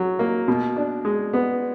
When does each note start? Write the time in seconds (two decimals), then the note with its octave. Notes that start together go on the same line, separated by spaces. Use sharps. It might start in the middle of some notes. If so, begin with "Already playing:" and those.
Already playing: F#3
0.19 A#3
0.48 B2
0.76 D4
1.05 G#3
1.33 B3